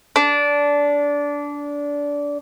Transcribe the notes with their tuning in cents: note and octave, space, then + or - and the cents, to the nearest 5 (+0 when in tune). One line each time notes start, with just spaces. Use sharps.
D4 -20